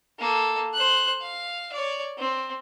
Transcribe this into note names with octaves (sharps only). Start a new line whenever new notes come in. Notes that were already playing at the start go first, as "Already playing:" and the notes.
A#3 A4
C5 F#6
F5
C#5 D5
C4